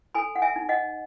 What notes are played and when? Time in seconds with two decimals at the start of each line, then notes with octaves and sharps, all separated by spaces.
0.15 A4 G#5 B5
0.36 F#5
0.42 E5 G#5
0.56 D#4
0.69 D#5 F#5